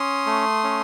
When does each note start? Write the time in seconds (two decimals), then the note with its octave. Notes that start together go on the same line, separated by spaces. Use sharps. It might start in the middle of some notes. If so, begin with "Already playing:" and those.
Already playing: C#4 C6 D#6
0.26 A3
0.64 C#4